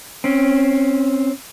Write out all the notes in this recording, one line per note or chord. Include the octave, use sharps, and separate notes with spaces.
C4 C#4